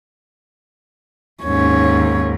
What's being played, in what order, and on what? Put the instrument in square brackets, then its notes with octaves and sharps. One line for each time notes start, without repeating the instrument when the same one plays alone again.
[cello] D#2 G#2 [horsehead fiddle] C#4 C#5